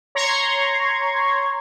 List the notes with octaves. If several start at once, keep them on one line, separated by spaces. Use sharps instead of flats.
C#5 A#5 C6 C#6 G#6